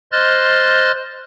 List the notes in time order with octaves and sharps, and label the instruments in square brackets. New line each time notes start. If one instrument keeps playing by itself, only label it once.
[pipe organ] C5 D#5 C6 F6 F#6 A6